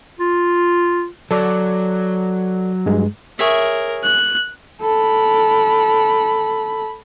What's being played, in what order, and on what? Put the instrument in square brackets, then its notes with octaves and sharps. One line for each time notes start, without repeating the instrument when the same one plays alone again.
[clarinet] F4
[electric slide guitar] F#3 [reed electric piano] A4 D5 D6
[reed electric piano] G2 G#3
[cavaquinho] G#4 C#5 E5 [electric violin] A#4
[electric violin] F#6
[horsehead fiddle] A4 B5